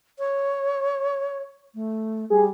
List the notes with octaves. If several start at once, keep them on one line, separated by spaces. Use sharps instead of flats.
C#5
A3
G3 G#4